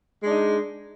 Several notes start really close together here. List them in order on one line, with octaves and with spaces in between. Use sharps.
G#3 D4 D#4